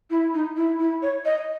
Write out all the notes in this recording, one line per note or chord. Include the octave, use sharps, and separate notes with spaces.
E4
D#4
E4
E4
C#5
D#5